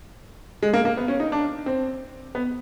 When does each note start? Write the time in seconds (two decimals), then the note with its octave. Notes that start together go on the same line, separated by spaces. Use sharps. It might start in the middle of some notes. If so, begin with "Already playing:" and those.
0.63 G#3
0.73 A#3
0.85 A#3
0.97 B3
1.08 C#4
1.20 D#4
1.32 D4
1.66 C4
2.35 B3